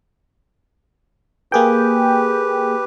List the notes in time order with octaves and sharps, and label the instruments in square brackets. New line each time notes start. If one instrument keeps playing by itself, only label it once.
[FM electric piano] A#3 G#4 G5 [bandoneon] G4 B4